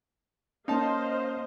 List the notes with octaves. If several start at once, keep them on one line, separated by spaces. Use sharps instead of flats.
A#3 C#4 D#4 C5 D#5 F5 A5